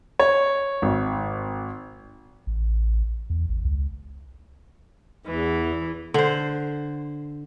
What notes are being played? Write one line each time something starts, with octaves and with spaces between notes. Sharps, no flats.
C#5
G#1
A1
E2
A1
C#2
E2 E3
D3 C5